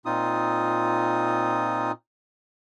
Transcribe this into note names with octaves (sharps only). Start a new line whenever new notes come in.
A#2 C4 D#4 F4 D#6